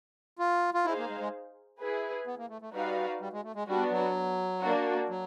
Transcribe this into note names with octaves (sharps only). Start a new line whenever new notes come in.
F4
F4
D#4 E4 G#4 C5 F5
A#3
G#3
G#3
E4 G#4 B4
B3
A#3
A3
A3
G3 D#4 F#4 B4 D5 F5
G3
G#3
A3
G#3
G3 B3 D4 F#4
F#3
A#3 D4 F#4
F#3